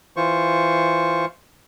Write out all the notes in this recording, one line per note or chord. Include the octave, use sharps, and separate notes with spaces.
E3 F4 C5 C#6